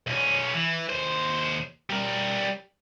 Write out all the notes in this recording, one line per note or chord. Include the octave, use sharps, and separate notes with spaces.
B1 C#4
E3
D#2 C5
G3 A#4